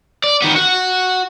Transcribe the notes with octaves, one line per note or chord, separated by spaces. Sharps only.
D5
D#3 B3
F#4